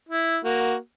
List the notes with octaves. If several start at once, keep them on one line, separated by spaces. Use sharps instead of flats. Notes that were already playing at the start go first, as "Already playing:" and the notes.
E4
A#3 F#4